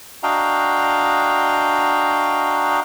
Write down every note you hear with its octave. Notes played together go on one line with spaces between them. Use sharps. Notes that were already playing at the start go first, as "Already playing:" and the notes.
D4 F#4 D#5 F5 G5 A#5